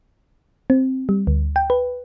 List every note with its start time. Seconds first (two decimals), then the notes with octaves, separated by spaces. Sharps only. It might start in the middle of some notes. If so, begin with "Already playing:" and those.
0.70 C4
1.09 G3
1.27 D2
1.56 G5
1.70 B4